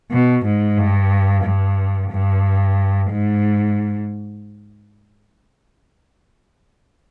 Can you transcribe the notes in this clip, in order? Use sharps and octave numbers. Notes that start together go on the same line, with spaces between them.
B2
G#2
G2
G2
G2
G#2